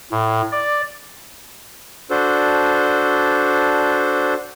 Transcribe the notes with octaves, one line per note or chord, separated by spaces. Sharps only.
A2
D5
D4 F#4 A4 C5